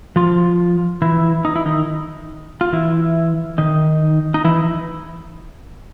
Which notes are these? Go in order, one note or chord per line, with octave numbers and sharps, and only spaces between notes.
F3 F4
E3 E4
D#4
E4
D#3 D#4
F4
E3 E4
D#3 D#4
D#4
E3 E4